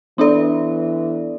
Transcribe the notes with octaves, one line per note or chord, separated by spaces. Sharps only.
E3 B3 D4 A4 D5